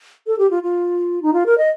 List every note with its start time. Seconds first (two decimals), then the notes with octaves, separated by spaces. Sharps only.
0.27 A4
0.39 G4
0.51 F4
0.63 F4
1.22 D#4
1.33 F4
1.46 A#4
1.58 D#5